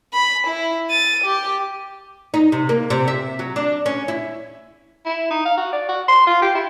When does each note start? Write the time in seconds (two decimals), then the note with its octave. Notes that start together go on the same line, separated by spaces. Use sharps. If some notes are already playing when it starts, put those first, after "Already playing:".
0.13 B5
0.47 E4
0.91 A6 D#7
1.24 G4
2.34 D#4
2.52 C3
2.69 A#3
2.90 C3
3.08 E5
3.39 F#3
3.56 D4
3.86 C#4
4.08 E4
5.06 E4
5.30 D#4
5.45 F5
5.58 F#4
5.73 D5
5.89 F#4
6.08 C6
6.27 F4
6.42 G4
6.55 E4